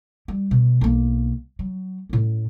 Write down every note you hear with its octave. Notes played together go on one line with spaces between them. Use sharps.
G3
B2
B1 A#3
F#3
A2 C#4